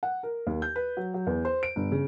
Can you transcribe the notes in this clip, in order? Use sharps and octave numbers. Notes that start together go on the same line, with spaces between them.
F#5
A#4
D#2
G6
B4
F#3
F#3
E2
C5
D7
G1
C#3